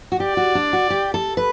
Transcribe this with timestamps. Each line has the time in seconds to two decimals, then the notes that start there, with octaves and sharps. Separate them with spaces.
0.12 F#4
0.20 G4 D5
0.37 F#4
0.55 D4
0.73 F#4
0.90 G4
1.14 A4
1.37 B4